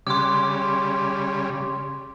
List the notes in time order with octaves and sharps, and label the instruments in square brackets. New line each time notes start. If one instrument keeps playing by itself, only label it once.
[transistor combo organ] C#3 G3 [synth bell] C6 D6